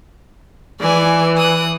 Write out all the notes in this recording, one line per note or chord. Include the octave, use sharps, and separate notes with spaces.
E3 D5 G#5
D#6 F#6